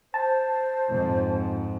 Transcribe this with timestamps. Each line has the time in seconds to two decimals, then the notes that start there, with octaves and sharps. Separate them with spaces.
0.14 C5 A5
0.89 F2 G#2